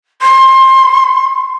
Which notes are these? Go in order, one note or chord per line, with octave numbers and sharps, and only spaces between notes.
C6